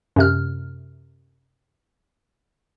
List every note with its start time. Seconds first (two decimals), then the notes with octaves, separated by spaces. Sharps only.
0.16 F#2 C3 F6